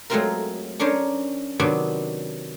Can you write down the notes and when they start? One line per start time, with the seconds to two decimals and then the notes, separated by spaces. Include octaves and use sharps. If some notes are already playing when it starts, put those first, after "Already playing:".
0.10 F#3 G#3 A3 C4 F4 A#4
0.80 C#4 D4 A#4 C5 C#5
1.60 C3 D#3 F#3 B3 D4 F#4